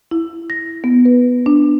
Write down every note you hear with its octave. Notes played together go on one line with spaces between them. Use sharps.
E4
A#6
B3
B4
D4